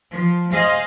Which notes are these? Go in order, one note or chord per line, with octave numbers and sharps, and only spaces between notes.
F3
G#4 C5 D#5 F5